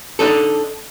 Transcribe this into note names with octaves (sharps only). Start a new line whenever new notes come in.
D4 D#4 A4